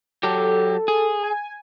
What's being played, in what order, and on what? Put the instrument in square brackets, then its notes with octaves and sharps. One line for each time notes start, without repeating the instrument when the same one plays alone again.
[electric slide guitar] F#3 G4 [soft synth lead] A4
[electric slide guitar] G#4
[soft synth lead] G#5